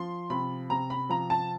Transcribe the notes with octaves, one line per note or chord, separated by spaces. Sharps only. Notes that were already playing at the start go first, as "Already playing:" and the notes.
Already playing: F3 C6
C3 B5
C3 A#5
B5
F3 A#5
A5